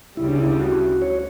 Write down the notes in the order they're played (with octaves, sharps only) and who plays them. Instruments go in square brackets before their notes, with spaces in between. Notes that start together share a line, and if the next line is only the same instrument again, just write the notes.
[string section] D2 C#3 G3 [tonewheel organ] E4
[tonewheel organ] D4
E4
F#4
C#5